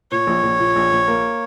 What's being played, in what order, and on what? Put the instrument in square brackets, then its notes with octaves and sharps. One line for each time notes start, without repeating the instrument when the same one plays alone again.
[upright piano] A#2 [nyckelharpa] C#5
[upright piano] A#1
A#1
A#2
A#1
A#1
A#3